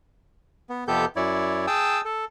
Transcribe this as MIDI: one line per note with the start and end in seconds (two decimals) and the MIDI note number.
0.70 0.84 59
0.88 1.05 41
0.88 1.05 48
0.88 1.05 59
0.88 1.05 67
0.88 1.05 69
0.88 1.05 91
1.16 1.66 42
1.16 1.66 64
1.16 1.66 73
1.16 1.66 74
1.67 2.01 68
1.67 2.01 79
1.67 2.01 81
1.67 2.01 87
1.67 2.01 88
2.05 2.25 69